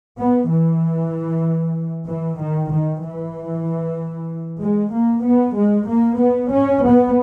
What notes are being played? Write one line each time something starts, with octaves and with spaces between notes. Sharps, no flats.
B3
E3
E3
D#3
D#3
E3
G#3
A#3
B3
G#3
A#3
B3
C#4
B3